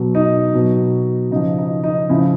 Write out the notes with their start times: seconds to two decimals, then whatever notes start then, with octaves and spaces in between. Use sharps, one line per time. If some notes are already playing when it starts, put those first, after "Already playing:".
Already playing: B2 F#3
0.15 D#4
0.54 B2 F#3
1.31 C#3 D#4
1.36 F3
1.58 D#4
1.84 D#4
2.09 C#3 F3 E4